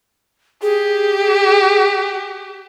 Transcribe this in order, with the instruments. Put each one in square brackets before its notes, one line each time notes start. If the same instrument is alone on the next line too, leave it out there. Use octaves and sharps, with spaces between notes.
[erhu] G4 [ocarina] G#4